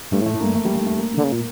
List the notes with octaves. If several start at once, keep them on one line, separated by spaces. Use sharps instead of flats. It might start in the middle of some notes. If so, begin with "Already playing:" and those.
G2 A3
A2
A3
A2
G2 A#3
A3
G3
A3
A3
A#3
D3 A#3
C#3
A#2